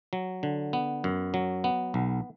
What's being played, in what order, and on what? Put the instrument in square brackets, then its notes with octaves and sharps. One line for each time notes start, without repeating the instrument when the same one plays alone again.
[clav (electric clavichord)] F#3
D3
B3
F#2
F#3
B3
B1